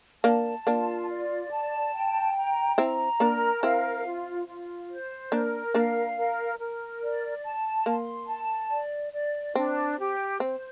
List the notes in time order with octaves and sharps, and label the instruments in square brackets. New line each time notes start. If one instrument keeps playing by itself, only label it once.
[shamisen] A#3 D4 [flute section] A5
[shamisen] A#3 D4 [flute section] F4
[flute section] D5
A5
G5
A#5
[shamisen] C4 E4 [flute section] A#5
[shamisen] A#3 D4 [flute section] A#4
[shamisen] C4 E4 [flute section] F5
[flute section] F4
F4
C5
[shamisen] A#3 D4 [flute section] A#4
[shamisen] A#3 D4 [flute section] F5
[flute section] A#4
A#4
D5
A5
[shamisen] A#3 [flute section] C6
[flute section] A5
D5
D5
[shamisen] C4 [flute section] D4
[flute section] G4
[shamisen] C4 [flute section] C5